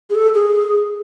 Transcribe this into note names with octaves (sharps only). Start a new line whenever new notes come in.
G#4
A4
G#4